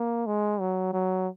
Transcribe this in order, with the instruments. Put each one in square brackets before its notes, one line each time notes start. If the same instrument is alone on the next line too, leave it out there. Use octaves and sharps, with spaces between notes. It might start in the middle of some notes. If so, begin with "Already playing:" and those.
Already playing: [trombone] A#3
G#3
F#3
F#3